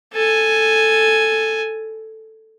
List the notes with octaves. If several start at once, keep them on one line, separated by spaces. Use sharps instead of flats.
A4 G#5